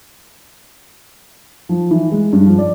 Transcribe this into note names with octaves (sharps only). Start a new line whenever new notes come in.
F3
E3
G#3
G2
F3
D5